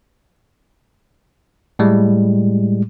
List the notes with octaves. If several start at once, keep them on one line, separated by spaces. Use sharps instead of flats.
A2 G3 G#3